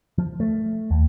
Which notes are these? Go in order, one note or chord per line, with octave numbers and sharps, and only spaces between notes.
F3
A3
D#2